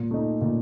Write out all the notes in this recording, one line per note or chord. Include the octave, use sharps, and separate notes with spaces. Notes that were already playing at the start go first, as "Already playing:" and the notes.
Already playing: A#2
A3 D#4
A#2